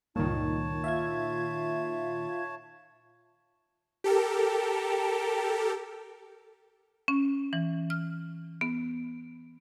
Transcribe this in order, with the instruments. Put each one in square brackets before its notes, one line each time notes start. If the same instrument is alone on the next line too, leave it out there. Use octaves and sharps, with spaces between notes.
[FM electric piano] C#2 G2 [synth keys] A#2 D#3 [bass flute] D#4 [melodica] C#5 A5
[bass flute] F4 [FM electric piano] E5 F5 G#6
[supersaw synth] G4 A4 A#4
[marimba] C#4
E3
F6
B3